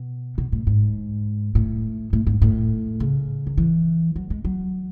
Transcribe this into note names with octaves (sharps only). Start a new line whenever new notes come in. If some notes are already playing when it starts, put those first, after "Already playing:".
Already playing: B2
B2
A2
G#2
A2
A2
G#2
A2
C#3
D#3
E3
F#3
G#3
F#3